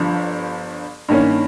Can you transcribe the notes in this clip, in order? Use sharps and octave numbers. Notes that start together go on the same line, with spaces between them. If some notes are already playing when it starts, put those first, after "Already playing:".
Already playing: G1 G2 F3
G2 D#3 A#3 C#4